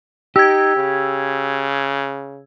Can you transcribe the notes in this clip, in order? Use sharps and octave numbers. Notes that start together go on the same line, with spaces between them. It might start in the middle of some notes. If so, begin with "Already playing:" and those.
D#4 G4 E6 G#6
C#3